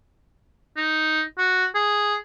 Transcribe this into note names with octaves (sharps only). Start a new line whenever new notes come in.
D#4
F#4
G#4